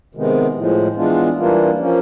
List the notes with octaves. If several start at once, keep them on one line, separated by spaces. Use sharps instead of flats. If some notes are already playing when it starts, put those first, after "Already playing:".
C3 D#3 G#3 B3
A2 F3 G#3
E3 G#3 B3 D4 F4
E3 G3 A#3 D4 F4
F3 A#3 C#4